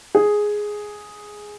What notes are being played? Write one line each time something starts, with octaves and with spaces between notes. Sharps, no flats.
G#4